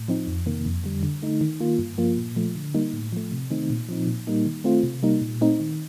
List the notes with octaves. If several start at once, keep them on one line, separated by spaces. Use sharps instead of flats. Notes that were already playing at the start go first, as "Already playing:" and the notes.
Already playing: A2
F3 C4 D#4
F2
C3 D#3 A#3
F2
D3 G3
D3
A3 D#4
D#3
A#3 F4
G2
F3 A#3 F4
A#2
F3 A3
D3
G3 A#3 D#4
A2
F3 A3
C3
D#3 A3 C4 D#4
A#2
F3 C4 D#4
A#2
G3 A#3 D#4
D#3
A3 C4 F4
C3
G3 A#3 D#4
A#2
A3 C4 D#4
D#3